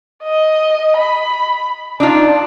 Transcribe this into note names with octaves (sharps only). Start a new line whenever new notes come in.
D#5
B5
D4 D#4 F4 A5